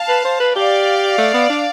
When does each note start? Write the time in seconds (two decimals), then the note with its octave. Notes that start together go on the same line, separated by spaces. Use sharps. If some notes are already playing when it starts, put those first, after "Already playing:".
Already playing: F5 A5
0.08 B4
0.25 C5
0.40 B4
0.55 G4 D5 F5
1.18 A3
1.34 B3
1.50 D4